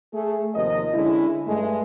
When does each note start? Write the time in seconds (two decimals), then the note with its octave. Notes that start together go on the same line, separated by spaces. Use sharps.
0.13 A3 G#4
0.54 D#2 C3 F3 A#4 D#5
0.93 D3 G#3 C#4 E4
1.46 G2 G#3 A3